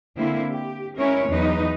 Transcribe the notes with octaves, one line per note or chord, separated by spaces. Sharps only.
D3 A#3 C4 E4
G4
G#3 C#4 E4 A#4 C#5
E2 F#3 D#4 B4